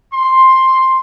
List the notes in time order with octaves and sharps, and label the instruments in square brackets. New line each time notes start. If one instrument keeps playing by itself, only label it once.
[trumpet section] C6